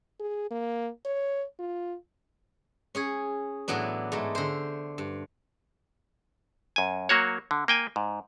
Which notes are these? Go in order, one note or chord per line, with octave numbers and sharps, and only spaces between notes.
G#4
A#3
C#5
F4
C#4 G#4 C#5
A2 E3 F#3 B3 D4
G#2 G#3 A3
D3 C5
G2
F#2 G#5
F#3 A#3 F#4 C#5
D3
A#3 G5 G#5
G#2